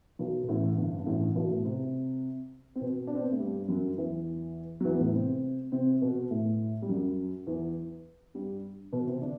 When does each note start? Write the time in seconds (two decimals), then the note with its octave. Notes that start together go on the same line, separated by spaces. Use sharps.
0.19 B1 B2
0.43 B2
0.48 A1 A2
0.77 G1 G2
0.99 G2
1.06 A1 A2
1.36 B1 B2
1.50 A2 A3
1.65 C3 C4
2.76 C4
2.81 B2 B3
3.07 D4
3.15 C4
3.23 B3
3.32 A3
3.39 G2 G3
3.68 F#2 F#3
3.98 E2 E3
4.81 F#3
4.85 E2 E3
4.94 B3
5.00 A2 A3
5.14 C3 C4
5.72 C3 C4
6.02 B2 B3
6.31 A2 A3
6.82 G3
6.89 F#2 F#3
7.47 E2 E3
8.34 G2 G3
8.93 B2 B3
9.07 C3 C4
9.22 D3 D4